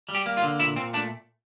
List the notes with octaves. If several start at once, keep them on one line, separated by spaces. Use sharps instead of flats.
G3
G4
A#3
F4
D3
A#2 E4
A#2 C4
A3 D4